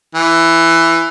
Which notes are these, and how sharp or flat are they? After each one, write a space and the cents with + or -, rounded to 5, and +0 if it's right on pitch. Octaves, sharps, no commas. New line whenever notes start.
E3 +10